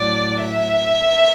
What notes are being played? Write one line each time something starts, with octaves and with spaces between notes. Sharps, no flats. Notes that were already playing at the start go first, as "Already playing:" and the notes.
Already playing: A2 F#3 D5
E5